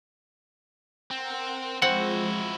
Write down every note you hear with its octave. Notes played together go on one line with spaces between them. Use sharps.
C4 A#4 F#5
F3 G#3 C4 E4 F#4 F#5